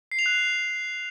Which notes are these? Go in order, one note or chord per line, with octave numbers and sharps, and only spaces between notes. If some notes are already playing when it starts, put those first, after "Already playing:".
C7
F7
F#6